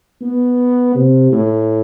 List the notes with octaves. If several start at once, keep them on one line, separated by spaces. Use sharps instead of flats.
B3
C3
A2